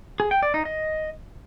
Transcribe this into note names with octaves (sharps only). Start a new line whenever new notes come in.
G#4
G5
D5
D#4
D#5